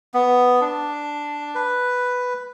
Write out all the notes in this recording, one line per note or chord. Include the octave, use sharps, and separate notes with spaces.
B3
D4
B4